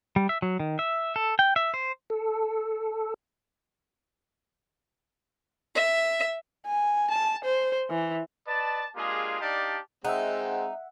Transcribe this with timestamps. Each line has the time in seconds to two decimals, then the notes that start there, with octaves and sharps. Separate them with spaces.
0.16 G3
0.29 E5
0.42 F#3
0.60 D#3
0.79 E5
1.16 A4
1.39 G5
1.56 E5
1.74 C5
2.10 A4
5.74 E5
6.66 G#5
7.11 A5
7.45 C5
7.90 E3
8.47 B4 D5 D#5 A5
8.96 G#3 A#3 D4 F4 G4 G#4
9.41 D4 D#4 G4 D5 F5 A5
10.05 G#3 C4 D#4 E5 F#5